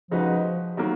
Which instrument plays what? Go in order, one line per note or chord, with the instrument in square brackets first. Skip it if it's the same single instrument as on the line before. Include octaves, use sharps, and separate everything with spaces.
[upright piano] C#3 G#3 D#4 F#4 B4 [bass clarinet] F3
[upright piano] D#3 F#3 A#3